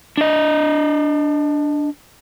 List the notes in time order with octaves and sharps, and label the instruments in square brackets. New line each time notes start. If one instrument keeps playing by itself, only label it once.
[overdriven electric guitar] D4 D#5